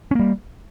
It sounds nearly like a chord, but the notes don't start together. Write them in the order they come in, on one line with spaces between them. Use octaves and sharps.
C#4 A#3 G3